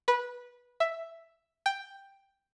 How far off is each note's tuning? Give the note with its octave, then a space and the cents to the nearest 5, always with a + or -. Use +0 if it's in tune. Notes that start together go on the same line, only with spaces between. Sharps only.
B4 -15
E5 +5
G5 +5